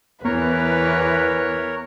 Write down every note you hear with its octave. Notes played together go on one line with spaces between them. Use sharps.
E2 E3 B3 A#4 B4 C#5